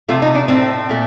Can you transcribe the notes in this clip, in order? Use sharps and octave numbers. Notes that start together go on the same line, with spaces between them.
C3 F3 A3 F4
D#4
D4
A2 A3 C4
A#2 A3